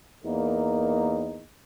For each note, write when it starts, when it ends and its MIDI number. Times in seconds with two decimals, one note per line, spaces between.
0.25 1.46 40
0.25 1.46 58
0.25 1.46 63
0.25 1.46 70